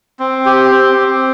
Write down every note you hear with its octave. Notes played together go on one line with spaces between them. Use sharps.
C4
G4
C4
C4